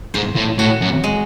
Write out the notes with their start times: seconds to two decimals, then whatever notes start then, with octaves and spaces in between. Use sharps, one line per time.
0.14 G#2 C5
0.36 A2
0.59 A2 F#4
0.82 F#2
1.04 G#3